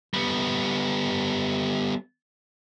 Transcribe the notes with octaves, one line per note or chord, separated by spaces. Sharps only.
G3 B3